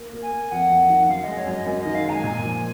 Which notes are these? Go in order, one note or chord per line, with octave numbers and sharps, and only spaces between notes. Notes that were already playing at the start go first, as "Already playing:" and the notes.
Already playing: A#3
A#3
G#5
A#3
F2 F#5
F2
D#3
F#2 F5
G#3 D#5
C#5
F#2 D#5
F#2
D#3 D#5
F5
G#3 A#5
G#5
A#2
F3